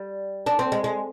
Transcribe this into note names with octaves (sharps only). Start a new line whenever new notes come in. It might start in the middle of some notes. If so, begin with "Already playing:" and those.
Already playing: G3
D4
C4
G#3
G#3